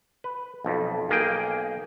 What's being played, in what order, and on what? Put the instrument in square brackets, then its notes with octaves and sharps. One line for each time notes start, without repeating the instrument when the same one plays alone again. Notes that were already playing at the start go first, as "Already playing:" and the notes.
[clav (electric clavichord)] B4
B1 F2
B1 A#3 G#4 G5